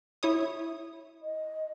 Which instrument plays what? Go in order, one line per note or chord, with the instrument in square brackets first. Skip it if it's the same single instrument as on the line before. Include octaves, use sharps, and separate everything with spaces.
[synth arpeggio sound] E4 C#5 D#6
[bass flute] D#5